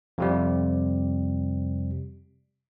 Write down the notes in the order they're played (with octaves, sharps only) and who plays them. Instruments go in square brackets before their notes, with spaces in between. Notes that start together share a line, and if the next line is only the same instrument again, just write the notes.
[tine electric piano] F2 C3 G3